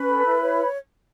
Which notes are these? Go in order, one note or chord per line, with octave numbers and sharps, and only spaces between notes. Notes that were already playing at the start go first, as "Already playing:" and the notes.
Already playing: C#4 B4 B5
A4
E4
C#5